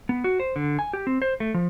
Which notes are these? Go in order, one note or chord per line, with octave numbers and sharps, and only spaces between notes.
B3
F#4
C5
D3
G#5
G4
C4
C5
A3
F3